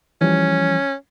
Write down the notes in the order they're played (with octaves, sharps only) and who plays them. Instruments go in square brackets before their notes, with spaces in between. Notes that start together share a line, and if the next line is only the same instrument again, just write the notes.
[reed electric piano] E3 F3 G3 [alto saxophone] C#4